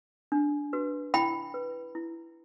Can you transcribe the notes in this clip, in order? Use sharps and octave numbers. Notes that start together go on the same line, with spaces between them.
D4
F#4 B4
E4 G5 B5
B4
E4